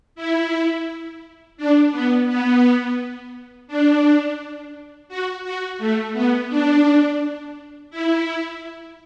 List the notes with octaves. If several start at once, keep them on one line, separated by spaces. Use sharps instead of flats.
E4
D4
B3
B3
D4
F#4
F#4
A3
B3
D4
E4